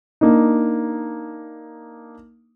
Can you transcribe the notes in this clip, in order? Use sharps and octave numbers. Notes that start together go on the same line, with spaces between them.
A#3 D4 D#4